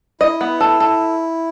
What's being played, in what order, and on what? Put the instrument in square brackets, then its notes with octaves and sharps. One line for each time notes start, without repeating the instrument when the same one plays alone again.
[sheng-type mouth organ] E4 [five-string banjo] D#5
[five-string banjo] B3
A4
A4